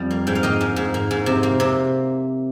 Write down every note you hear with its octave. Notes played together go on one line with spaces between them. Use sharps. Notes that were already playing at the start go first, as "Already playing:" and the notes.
Already playing: F2 G3
A#3
G#2 G5
F5
A#3 D#5 G5
G#2
G#2
A#3
G#2
C3
A#3
C3